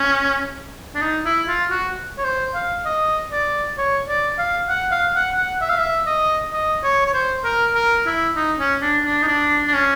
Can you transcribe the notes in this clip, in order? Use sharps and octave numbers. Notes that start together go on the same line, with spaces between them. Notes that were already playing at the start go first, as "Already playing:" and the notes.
Already playing: C#4
D4
D#4
E4
F4
F#4
C#5
C5
F5
D#5
D5
C#5
D5
F5
F#5
F5
F#5
F#5
E5
F5
E5
D#5
D#5
C#5
C#5
C5
A#4
A#4
E4
D#4
C#4
D4
D4
D#4
D4
D4
C#4